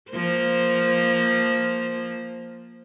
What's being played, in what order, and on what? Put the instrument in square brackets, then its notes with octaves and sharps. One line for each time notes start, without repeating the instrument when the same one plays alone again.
[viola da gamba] F3 A#3 C5